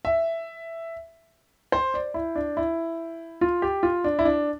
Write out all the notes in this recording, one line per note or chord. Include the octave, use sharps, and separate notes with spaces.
E5
C5
D5
E4
D4
E4
F4
G4
F4
D4
E4
D4